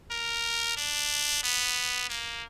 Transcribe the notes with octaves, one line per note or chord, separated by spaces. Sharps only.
A#4
D4
B3
A#3